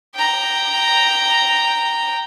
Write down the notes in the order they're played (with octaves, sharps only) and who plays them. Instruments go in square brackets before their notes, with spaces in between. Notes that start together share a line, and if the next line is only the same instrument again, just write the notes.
[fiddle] G5 A#5